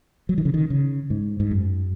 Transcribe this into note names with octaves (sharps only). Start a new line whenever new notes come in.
F#3
D#3
C#3
D#3
C#3
G#2
G#2
F#2